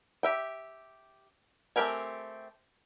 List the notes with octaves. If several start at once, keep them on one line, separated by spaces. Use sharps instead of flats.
G4 E5 G5
A3 C4 G4 A#4 G#5